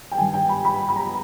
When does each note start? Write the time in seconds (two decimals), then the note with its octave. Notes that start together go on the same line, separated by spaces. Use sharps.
0.11 G5
0.18 G2 D#3 G#5
0.34 G5
0.49 B5
0.65 B5
0.89 B5
0.96 A#5